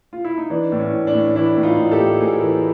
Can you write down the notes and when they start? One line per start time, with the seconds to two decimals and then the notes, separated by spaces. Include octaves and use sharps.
0.13 F4
0.25 E4
0.38 D#4
0.50 E3 D4
0.72 A2 D4
0.79 C#4
0.92 A2
1.07 D4
1.14 A2
1.35 E3 D4 E4
1.57 A2
1.63 D#4 F4
1.78 A2
1.92 G4 A4
1.99 A2
2.20 A2 G#4 A#4
2.42 E3